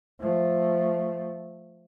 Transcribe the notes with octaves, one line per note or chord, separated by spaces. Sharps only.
F3 A3